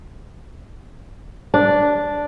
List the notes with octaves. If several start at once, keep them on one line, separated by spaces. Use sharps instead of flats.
D4